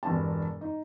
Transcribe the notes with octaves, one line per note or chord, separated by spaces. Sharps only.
E1 G2 A5
D#4